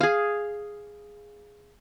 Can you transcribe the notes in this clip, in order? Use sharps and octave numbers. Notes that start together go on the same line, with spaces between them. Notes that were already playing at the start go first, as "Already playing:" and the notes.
G#4 F5